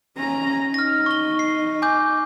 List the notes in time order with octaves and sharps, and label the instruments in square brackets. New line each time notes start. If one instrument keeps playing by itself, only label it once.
[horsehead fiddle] C#4 A#5
[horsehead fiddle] D#4 [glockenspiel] F6 A#6
[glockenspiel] C#6 G7
C7
G#5 D6 G6